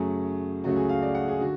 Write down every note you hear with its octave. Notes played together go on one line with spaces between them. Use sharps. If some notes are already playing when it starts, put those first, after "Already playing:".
Already playing: F#2 C#3 F#3 A3 G#4
C#2 C#3 F#3 A3 F#4
G#4
F5
D5
F#5
G#4
D3 F#4